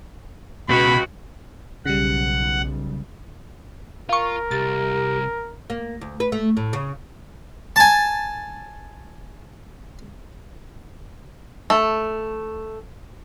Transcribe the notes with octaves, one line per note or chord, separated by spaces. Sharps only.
C#2 B2 B3 F#4 B5
B1 C#3 G3 F#5
F4 A#4 F5 C#6
C2 G4 A6
A#3
D2
B4
A3
A2
C#3
G#5 A5
A3